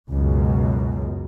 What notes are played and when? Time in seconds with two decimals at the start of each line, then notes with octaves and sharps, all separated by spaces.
0.10 C#2 F#2 B2